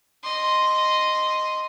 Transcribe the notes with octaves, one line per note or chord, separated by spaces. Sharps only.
D#5 C6